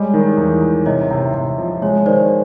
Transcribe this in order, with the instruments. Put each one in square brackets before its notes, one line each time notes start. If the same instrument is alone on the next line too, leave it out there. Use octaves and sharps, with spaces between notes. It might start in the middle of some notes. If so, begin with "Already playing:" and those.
Already playing: [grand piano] G3 G#3 [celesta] C#5 D#5
[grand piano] D#3
E2
E2
[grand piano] C3 [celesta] C#5 D#5
[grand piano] C3
C3
F3
[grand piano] G#3 [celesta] C#5
[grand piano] D#3 [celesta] C5 D5